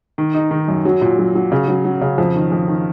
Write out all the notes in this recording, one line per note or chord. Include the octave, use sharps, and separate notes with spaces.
D#3
D#4
D#3
F#2
F#3
A#2
F#3
F#3
C#3
F#3
F#3
C#3
F2
D#3
F2
D#3